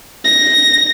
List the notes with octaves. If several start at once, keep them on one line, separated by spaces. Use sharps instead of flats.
A#6